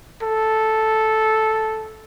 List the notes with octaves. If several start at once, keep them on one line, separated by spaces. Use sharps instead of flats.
A4